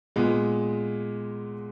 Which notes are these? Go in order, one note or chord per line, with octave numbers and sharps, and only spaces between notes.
A#2 G#3 B3